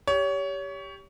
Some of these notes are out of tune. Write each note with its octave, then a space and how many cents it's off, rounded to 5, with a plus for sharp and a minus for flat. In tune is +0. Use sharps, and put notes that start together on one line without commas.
G4 +5 C#5 +25